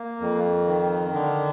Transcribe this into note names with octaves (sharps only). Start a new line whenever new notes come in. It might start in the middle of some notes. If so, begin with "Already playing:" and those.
Already playing: A#3
F2
D#3
D3